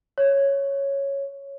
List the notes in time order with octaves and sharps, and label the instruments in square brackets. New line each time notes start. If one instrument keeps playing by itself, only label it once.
[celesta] C#5